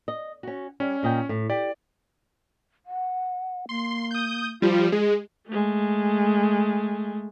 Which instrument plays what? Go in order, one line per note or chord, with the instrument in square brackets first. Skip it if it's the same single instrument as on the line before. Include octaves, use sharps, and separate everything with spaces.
[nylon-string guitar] D#5
C#4 F#4
[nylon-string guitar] G3 [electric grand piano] C#4
[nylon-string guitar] A#2 D#5 G5
A2
[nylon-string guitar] G4 [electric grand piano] D5
[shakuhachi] F#5
[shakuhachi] A#3 [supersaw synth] C6
[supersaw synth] D#6 G6
[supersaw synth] F3 G3 [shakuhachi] F4
[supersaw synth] G#3 [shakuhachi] G#4
[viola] G#3 A3